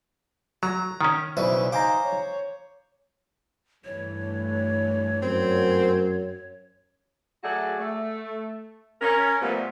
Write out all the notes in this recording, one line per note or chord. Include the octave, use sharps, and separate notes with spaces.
F#3 A#5
D#3 C#4
B1 C#3 E3 B4 C5 D5 E5
D#4 C5 F5 G#5 A#5 D6
C#5
G2 E3 A3 C#5
F#2 C4
F#3 A3 F#4 G#4 D5
A3
C#4 A#4
A#2 F3 G3 A3 B3